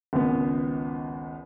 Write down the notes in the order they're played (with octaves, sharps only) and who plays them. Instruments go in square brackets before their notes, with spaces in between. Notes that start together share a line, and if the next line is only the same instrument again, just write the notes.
[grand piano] G#1 C#2 B3